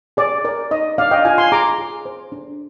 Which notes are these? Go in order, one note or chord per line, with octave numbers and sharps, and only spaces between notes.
G#4 D5
A#4 D5
D#4 D#5
D4 D5 F5
D#5 G5
F4 F5 G#5
G#5 C6
G#4 A#5 D6
G#4
C5
D4